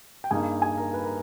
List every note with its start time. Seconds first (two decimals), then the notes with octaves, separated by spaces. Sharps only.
0.24 G5
0.31 G2 G3 A#3 D#4 G#4 G#5
0.62 G#4 G#5
0.78 A#4 A#5
0.93 B4 B5
1.04 A#4 A#5